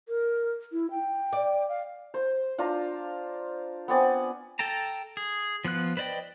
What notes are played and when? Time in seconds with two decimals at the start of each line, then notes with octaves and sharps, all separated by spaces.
0.08 A#4
0.72 E4
0.91 G5
1.33 D5
1.69 F5
2.14 C5
2.58 D4 F4 A#5
3.88 B3 C4 D5 G#5
4.59 A4 G5 A5 A#5
5.17 G#4
5.65 F3 B3 F4 F#6
5.97 B4 C5 D5 D#5 G5